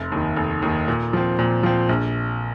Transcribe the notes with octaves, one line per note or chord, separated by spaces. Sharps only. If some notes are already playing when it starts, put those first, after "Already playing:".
Already playing: F1
D#2 D#3
F1
D#2 D#3
A#2
F3 C4
A#2
F3 C4
A#1